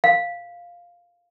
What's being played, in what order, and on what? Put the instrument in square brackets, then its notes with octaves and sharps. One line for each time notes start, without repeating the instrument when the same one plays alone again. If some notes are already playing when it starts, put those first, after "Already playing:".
[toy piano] F5